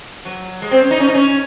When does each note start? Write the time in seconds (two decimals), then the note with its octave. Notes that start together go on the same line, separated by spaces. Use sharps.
0.25 F#3
0.62 G#3
0.71 C4
0.81 C#4
0.91 D#4
1.00 C#4
1.08 D#4
1.15 C#4